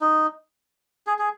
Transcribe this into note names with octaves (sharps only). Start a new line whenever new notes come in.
D#4
G#4
G#4